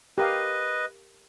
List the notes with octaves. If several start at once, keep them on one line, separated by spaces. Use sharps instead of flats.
G4 A#4 B4 D#5 F5